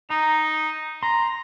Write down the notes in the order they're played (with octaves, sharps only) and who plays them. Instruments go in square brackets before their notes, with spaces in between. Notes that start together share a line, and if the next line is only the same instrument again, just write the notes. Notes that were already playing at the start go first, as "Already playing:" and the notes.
[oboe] D#4 [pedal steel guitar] A#5
[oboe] A#5 [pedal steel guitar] C6